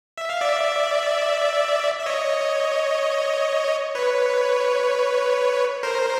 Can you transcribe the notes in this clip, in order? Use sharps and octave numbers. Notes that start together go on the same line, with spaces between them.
E5
F5
D5 E5
E5
C#5 D#5
B4 C#5
A#4 C5